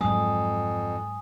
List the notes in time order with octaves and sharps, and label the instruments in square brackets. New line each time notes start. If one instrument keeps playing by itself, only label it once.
[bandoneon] F2 [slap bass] G#2 F#3 G#3 [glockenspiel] G#5 D#6